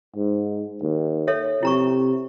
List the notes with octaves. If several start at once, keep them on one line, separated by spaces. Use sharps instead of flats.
G#2
D#2
A4 C#5 E5
C3 E4 A#5 C#6